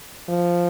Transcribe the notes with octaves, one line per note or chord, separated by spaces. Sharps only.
F3